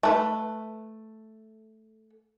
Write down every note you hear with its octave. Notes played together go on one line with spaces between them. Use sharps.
A3 B4